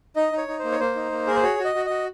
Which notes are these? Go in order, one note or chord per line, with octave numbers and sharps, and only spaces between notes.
D#4 D#5
D#4
C#5
D#4
A#3 C5
C#5
A#3 C5
D#4
A#3
G#4 A#4
C5
F#4 C#5
F#4
D#5
F#4
F#4 D#5